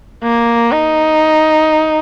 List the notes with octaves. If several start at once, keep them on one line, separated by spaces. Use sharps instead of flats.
A#3
D#4